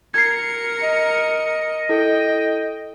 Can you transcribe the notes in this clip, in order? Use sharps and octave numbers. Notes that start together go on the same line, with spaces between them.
A#4 G#6 C7 C#7
D#5
E4 A4 G5